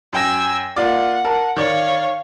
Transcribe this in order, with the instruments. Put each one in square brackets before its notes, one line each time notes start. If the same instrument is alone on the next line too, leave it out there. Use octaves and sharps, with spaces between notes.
[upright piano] F#2 G5 A#6 [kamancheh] G#5 E6
[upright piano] A#3 F4 D5 [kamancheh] F#5
[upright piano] A#4 A5
[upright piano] D#3 D5 [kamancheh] C#5 F5